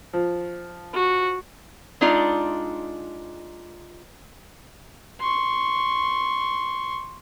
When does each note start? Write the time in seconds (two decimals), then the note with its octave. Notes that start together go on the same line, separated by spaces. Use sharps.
0.13 F3
0.94 F#4
2.01 G#3 D4 D#4 F4 D5
5.20 C6 C#6